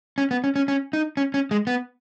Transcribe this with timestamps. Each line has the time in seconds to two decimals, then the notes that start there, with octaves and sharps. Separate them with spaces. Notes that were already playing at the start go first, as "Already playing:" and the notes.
0.18 C#4
0.31 B3
0.44 C#4
0.56 C#4
0.68 C#4
0.93 D#4
1.17 C#4
1.34 C#4
1.51 G#3
1.67 B3